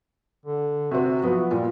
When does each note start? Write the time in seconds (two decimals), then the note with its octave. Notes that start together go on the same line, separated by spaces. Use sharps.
0.45 D3
0.91 C3 C4 F#4
1.23 F3 F#3 B3
1.51 A#2 G3